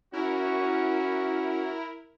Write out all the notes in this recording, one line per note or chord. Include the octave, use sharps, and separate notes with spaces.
C#4 E4 F#4 A#4